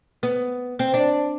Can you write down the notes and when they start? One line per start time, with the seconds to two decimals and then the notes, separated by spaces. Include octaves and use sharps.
0.23 B3
0.79 C4
0.94 D4